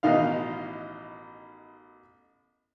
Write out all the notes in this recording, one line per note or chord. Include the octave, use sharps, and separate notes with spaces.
A1 B2 D#3 D#4 F5